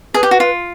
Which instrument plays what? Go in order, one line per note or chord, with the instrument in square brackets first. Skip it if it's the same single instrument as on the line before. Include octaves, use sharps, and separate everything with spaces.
[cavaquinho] G#4 [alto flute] B4
[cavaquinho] G4
F#4
F4